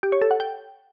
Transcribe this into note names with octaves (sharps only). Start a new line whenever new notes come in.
G4
C#5
A4
F#5
G5